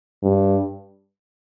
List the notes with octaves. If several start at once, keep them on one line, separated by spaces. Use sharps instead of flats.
G2